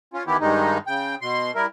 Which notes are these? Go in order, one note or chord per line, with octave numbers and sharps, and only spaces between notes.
C#4 F4
D#3 E3 B3 E4 G4
G2 D#3 G3 G#3 D#4
C#3 G5
B2 C6
G3 E4 A#4